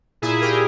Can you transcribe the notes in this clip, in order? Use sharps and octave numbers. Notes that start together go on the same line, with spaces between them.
A#2 E4 G#4
G4 A#4